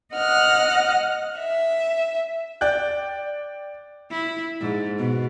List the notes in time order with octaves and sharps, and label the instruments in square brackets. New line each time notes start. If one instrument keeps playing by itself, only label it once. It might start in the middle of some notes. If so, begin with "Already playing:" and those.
[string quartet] D#5 F#5 F6 F#6
E5
[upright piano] D5 G5 F#6 G6
[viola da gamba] E4
G#2
B2